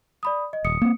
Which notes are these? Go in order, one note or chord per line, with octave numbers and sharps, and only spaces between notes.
D5 B5 D#6
D#5
D#1 D#6 C#7
A#3 C4